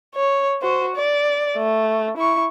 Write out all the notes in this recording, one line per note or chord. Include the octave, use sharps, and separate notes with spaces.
C#5
F#4 C5
D5
A3
E4 C#6